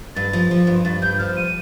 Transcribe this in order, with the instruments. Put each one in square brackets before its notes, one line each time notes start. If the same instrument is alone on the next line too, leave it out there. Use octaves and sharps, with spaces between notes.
[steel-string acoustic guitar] G2 [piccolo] A6
[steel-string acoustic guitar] F3
F3
G2
[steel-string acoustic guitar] G2 [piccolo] A6
[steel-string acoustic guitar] G2 [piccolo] G6
[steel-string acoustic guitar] F3 [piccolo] F6
[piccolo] D#7